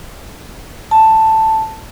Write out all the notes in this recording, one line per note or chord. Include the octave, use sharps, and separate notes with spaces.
A5